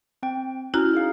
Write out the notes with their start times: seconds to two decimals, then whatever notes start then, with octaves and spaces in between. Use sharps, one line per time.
0.23 C4 G5
0.74 C#4 E4 F#4 A#5 F6
0.93 D#4 G#4 F5